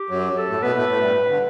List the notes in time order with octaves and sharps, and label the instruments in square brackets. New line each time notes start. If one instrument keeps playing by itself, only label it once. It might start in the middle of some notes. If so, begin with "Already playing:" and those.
Already playing: [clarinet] G4
[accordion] F#2 F#3
[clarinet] A4
[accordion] A2 A3
[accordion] B2 B3 [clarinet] B4
[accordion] A2 A3
A2 A3
G2 G3
D3